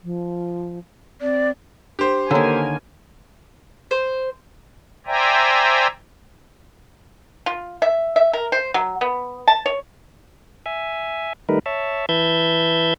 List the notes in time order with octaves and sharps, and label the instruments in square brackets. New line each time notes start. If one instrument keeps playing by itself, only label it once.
[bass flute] F3
[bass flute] C4 [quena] D5
[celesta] D4 [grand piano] G4 C5
[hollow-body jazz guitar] D3 D#3 [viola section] A#3 G#5 [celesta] A4 C#5 A#5
[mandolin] C5
[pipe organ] C5 D5 E5 G5 G#5 A#5
[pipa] F4
E5
E5
A#4
C5
F#3
B3
A5
C#5
[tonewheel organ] E5 G#5
D#3 G3 A3 D#4 A#4 B4
C#5 E5 A5
E3 B4 E5 A5 G6 G#6